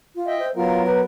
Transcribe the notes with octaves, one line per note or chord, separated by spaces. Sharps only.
F4
D#5 E5 G5
C5
F#3 B3 F4 A#4
B4